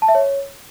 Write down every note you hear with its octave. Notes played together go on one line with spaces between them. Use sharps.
A5
E5
C#5